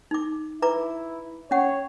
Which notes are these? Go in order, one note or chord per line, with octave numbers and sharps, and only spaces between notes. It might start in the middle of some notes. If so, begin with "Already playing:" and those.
D#4 D6
E4 B4 A#5 D6
C#4 C#5 F#5